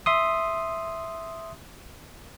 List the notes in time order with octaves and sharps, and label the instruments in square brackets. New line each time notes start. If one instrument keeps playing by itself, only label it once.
[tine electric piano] E5 C6 D#6